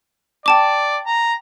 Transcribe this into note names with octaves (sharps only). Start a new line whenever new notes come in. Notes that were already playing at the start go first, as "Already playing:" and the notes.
D5 G5 A5 D6
A#5